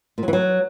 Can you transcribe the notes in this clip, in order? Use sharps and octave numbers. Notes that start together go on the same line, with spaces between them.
A#2
F#3
E3
F#3